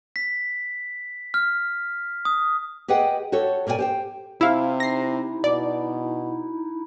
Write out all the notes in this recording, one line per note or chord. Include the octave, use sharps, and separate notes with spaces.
B6
F6
D#6
G4 G#4 B4 D#5 F#5 G5
F#4 G4 A4 C#5
A#2 A#4 D5 D#5 G5 G#5
G4 C5 G5
C3 E4 F5
D#4 E4 A#6 C7
B2 D5